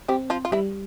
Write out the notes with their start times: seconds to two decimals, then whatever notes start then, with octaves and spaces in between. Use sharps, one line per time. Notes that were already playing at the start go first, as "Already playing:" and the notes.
0.08 G3 C4 G4
0.30 F3 F4
0.45 F4
0.52 E3 G3 E4